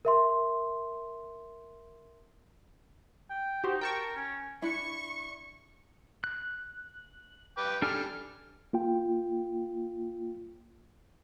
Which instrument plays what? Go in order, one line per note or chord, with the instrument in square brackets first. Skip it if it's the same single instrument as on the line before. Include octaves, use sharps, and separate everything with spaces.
[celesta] A#4 E5 C6
[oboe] G5
[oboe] D#4 [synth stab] F#4 G4 C5
[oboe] A#4 [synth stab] G5 A5 C#6
[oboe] C#4
[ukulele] D4 E4 [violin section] C#6
[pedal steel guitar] F#6
[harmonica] B4 G5 D6
[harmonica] G3 F6 [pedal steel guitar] D4 A4 G#5
[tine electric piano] A#3 F4 G5